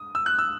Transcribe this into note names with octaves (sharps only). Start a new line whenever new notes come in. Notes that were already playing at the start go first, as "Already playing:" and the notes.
Already playing: D#6
E6
F#6
E6